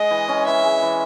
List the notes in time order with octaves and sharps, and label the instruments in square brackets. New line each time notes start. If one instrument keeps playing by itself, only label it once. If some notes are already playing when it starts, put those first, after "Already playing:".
Already playing: [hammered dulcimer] G#3 [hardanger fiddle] D#5
[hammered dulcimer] E3
C#4
[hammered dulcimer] E3 [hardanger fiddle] E5
[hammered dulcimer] G#3
E3